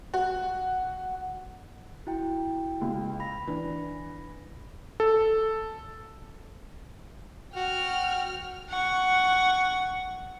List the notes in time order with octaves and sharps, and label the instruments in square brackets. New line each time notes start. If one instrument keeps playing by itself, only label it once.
[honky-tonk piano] F#4
[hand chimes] E4 F#4 G5
[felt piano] C#2
[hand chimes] B5 A#6
[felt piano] E3 D4
[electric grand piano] A4
[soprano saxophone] F#4 [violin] G5 F6
[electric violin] F#5 C#6